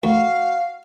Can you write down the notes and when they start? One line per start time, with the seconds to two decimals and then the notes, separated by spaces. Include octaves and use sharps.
0.03 D2 F#4 F5